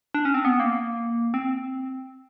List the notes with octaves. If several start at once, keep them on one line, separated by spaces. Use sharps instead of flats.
D4
C#4
C4
B3
A#3
C4